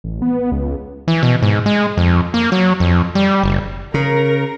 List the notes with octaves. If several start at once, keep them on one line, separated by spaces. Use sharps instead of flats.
A1
B3
C#2
E3
B2
G#2
G#3
F2
A#3
F#3
F2
G3
F#1
C#3 A#4